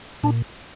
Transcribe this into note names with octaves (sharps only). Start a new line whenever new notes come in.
A#2 D4